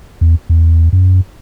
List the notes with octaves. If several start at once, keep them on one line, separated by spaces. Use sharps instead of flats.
E2
E2
F#2